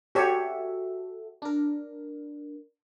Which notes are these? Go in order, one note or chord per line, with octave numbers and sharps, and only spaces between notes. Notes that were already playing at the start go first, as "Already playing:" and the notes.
F#4 G4 A4 C#5 E5
D4 A#4